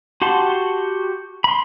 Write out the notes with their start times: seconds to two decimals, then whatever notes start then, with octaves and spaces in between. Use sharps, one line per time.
0.22 F#4 G4 F#5 A5 C6
1.44 B5 C6